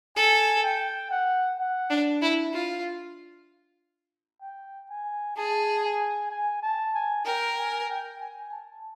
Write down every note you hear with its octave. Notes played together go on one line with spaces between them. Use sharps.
A4 G#5
G5
F#5
F#5
D4
E4
F4
G5
G#5
G#4 A5
G#5
G#5
A5
G#5
A#4 G5
G#5
G5
G#5
A5